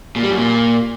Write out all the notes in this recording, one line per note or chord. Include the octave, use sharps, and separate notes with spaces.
A#2
G3
F#2
A#2